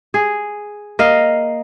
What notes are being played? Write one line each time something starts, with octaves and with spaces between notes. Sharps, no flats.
G#4
A#3 D#5 F5